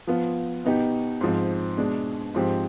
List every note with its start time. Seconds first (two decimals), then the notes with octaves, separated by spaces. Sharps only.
0.07 F3 B3 F4
0.64 B2 B3 D#4 G4
1.21 G#2 F3 C4
1.78 B2 G#3 D4
2.35 G#2 F3 C4 G4